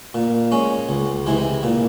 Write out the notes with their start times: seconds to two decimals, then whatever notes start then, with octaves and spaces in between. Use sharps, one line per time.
0.14 A#2
0.52 G#3 C#4
0.89 C#2
1.27 C3 E3 G#3 E4
1.63 A#2